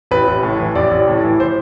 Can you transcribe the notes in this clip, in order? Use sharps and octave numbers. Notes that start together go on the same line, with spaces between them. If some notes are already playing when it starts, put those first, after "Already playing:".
A1 B4
A1
A2
E3
A1 D5
A1
A2
E3
C5